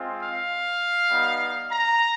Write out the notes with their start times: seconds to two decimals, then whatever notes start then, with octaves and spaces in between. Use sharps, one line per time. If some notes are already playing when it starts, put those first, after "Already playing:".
Already playing: G#3 C4 F4
0.19 F5
1.10 G3 B3 D#4
1.70 A#5